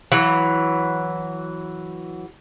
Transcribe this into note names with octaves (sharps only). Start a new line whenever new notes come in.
E3 F#3